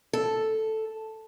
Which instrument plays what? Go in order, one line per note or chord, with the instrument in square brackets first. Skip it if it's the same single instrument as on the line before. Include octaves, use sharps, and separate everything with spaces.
[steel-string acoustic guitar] A4